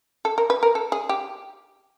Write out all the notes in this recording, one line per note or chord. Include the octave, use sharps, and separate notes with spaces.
A4
A#4
B4
A#4
A4
G#4
G4